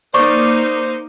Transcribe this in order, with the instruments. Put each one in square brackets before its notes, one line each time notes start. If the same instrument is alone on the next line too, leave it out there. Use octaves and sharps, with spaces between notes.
[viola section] A#3 D#4 [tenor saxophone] C5 [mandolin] D5 [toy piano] C#6